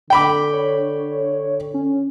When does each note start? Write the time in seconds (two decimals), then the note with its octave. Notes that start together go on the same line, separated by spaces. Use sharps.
0.10 D3 G5 B5 D6
0.53 C#5
1.74 C#4